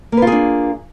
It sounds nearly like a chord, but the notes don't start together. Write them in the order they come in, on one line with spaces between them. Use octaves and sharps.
A#3 B4 F4 G#4 D4